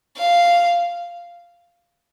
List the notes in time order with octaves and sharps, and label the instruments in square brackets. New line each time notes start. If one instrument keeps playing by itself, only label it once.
[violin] F5